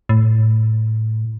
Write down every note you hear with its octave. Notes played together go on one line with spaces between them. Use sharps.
A2